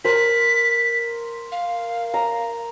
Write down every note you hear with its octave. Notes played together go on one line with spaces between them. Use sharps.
A#4 C5 B6
F5
A#5